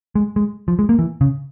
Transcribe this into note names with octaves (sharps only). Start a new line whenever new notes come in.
G#3
G#3
F3
G#3
A#3
E3
C#3